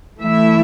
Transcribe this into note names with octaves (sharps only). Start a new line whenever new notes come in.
E3 A3 E4 E5